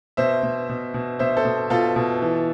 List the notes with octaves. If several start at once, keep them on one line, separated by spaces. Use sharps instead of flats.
B2 C5 E5
B2
B2
B2
B2 C5 E5
A4 C5
B2
B2 F4 A4
B2
E3